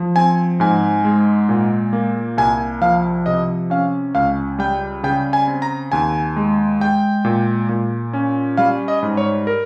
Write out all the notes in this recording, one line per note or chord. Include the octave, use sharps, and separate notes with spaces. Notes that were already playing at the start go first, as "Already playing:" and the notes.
Already playing: F3
C4 G#5
G#2 G#5
G#3
A#2
A#3
C2 G#5
F3 F5
C3 D#5
C#4 F5
C#2 F5
G3 G5
C#3 G5
G#5
C4
A#5
D#2 G#5
G#3
G#3 G5
A#2
A#2
C#4
G3 F5
D#5
G#2
C#5
A#4